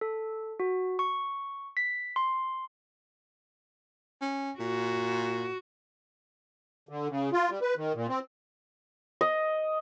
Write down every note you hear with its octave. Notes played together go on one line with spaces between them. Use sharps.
A4
F#4
C#6
B6
C6
C#4
A#2 F#4
D3
C#3
F4
G3
B4
D#3
A#2
C4
D#5